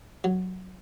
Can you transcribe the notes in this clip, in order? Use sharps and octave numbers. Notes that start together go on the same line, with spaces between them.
F#3